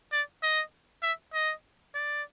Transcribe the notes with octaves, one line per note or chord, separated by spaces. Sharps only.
D5
D#5
E5
D#5
D5